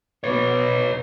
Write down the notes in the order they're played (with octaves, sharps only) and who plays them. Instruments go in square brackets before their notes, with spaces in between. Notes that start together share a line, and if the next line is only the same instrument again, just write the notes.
[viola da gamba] B2 [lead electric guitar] B4 C#5